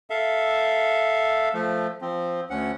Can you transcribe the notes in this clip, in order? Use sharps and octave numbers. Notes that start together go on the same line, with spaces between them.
A4 E5 F5
F3 A3
F3 C4
D2 C#4 F#5